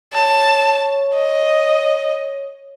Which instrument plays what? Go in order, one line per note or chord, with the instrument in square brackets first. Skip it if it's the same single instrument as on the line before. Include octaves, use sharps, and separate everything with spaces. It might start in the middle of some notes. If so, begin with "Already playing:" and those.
[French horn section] C#5 [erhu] A5
[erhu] D#5